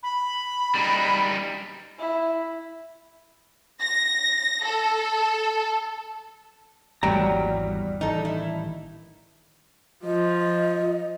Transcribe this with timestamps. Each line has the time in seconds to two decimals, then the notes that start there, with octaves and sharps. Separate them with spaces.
0.03 B5
0.75 G3 D#4
1.99 E4
3.81 A#6
4.64 A4
7.03 G#1 E2 F#3 G3 A#3 G5 A#5
8.01 A1 D#3 E3 D#4 A4
8.25 E4
10.04 F3 D#5